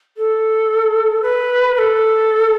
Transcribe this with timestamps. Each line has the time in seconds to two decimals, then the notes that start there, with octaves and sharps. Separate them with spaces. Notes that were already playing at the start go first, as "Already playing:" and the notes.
0.17 A4
1.22 B4
1.75 B4
1.78 A4